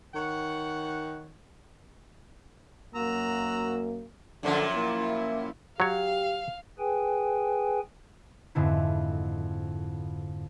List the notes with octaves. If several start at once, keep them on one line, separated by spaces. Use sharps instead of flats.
D#3 C#5 F#5
F#2 A#3 F#4 A#5 E6
F#2 A#2 D3 F3
A#3 E4
F#3 G4 C#5 F5
G#4 B4 G5 G#5
F2 G#2 D3 E4